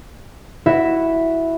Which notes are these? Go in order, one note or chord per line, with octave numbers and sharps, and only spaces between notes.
E4 F#4 E5